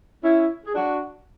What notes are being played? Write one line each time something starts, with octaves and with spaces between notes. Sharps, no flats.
C#4 E4
G#4
D4 F#4